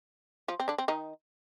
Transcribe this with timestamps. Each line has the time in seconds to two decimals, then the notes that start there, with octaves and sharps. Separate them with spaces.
0.48 F3 F4
0.60 C4
0.68 D3 D4
0.78 C4
0.88 D#3 D#4